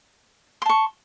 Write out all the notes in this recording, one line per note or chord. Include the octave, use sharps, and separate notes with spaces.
A5 C6 C#6